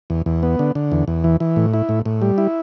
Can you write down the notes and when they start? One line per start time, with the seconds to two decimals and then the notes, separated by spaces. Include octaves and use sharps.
0.10 E2
0.26 E2
0.43 B3
0.59 D3
0.75 D3
0.92 E2
1.08 E2
1.24 E3
1.40 E3
1.56 A2
1.74 E4
1.89 A2
2.06 A2
2.22 G3
2.38 E4